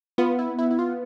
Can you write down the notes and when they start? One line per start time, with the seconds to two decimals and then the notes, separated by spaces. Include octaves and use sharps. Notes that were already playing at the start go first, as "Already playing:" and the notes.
0.18 B3 F4
0.39 E4
0.59 E4
0.71 E4
0.79 F4